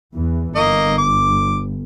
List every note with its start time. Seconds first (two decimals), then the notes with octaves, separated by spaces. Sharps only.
0.13 E2 E3
0.56 G1 A#3 D#5
0.98 D6